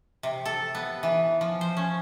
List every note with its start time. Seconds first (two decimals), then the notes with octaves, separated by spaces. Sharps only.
0.23 C3
0.45 A4
0.75 B3
1.03 E3
1.41 F3
1.61 C5
1.77 C#4